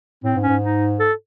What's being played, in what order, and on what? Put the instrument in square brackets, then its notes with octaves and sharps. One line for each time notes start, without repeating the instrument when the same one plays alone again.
[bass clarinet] A2 [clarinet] C4
[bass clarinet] G#2
[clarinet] C#4
[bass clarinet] G#2
[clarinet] D#4
A4